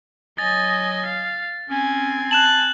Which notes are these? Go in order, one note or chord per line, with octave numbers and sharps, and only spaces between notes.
F#3 D#5 G#5 A6
F5
C4 C#4 G#5
A5 F#6 E7 F#7